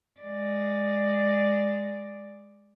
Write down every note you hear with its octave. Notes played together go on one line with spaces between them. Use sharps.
G#3 D5